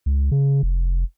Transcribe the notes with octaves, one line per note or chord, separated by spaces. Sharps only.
C#2
C#3
F1